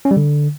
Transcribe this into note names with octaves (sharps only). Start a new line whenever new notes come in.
C#4
G3
D3